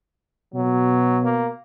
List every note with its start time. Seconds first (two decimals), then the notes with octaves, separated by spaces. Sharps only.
0.54 B2 F#3
1.24 A#3